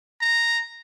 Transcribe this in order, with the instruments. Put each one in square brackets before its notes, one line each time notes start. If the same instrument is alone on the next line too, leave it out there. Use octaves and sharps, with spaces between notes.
[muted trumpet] A#5